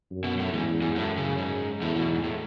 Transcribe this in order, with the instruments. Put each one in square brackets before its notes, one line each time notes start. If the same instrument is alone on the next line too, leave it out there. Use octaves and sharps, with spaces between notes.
[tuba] F#2
[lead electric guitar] B2
A2
[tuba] E2 [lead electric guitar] G#2
[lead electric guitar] G#2
[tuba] F#2 [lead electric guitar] A2
[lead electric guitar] C#3
G#2
[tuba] E2 [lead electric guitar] A2
[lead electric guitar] B2
G#2
A2